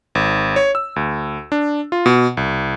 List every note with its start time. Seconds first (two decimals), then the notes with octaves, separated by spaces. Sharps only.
0.15 G#1
0.56 C#5
0.75 E6
0.96 D2
1.52 D4
1.92 F4
2.06 B2
2.37 C2